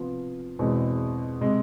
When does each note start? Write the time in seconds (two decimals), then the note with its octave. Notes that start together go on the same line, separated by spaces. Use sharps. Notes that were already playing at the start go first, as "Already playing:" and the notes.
Already playing: C3 F3 B3 F4
0.59 E2 B2 G#3 C4
1.41 C3 G#3